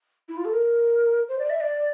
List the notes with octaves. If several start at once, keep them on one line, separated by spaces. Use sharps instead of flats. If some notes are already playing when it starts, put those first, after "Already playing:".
E4
F4
A4
A#4
C5
D5
E5
D5